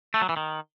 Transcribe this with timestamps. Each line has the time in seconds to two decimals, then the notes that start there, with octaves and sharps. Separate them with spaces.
0.14 A3
0.22 F#3
0.29 E3
0.37 D#3